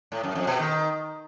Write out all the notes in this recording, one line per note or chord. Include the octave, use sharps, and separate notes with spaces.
A2
F#2
F2
B2
D#3